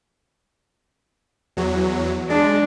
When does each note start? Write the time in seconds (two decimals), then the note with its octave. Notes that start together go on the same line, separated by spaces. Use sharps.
1.57 E2 F#3
2.30 G#3 D4